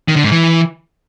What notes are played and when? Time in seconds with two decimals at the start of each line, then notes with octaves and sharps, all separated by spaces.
0.08 D#3
0.16 D3
0.24 G#2
0.32 E3